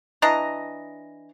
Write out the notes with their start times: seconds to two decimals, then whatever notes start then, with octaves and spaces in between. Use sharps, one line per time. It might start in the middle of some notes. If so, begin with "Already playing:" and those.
0.22 E3 D4 D#5 A#5